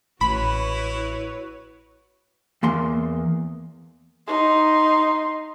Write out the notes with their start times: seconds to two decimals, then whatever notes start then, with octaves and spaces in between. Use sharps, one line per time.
0.21 A1 E4 F#4 B4 C#5 B5
2.63 E2 A#3 C6
4.28 D#4 C6